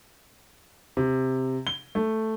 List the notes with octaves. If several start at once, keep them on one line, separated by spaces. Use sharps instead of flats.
C3
G7
A3